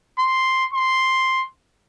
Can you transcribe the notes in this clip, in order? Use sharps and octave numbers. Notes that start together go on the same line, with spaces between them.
C6
C6